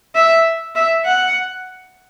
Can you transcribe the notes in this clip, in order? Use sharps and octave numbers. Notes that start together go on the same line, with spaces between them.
E5
E5
F#5